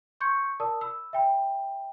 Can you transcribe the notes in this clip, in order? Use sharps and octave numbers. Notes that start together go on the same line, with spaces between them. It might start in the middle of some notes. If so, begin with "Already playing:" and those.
C6 C#6 G6 G#6 C#7
A#4 D5 A5 D#6 E6
B5 E6
E5 G5 B5